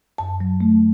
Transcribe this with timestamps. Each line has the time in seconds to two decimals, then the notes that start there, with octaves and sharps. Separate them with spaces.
0.18 F#2 A5
0.41 F#3
0.61 A3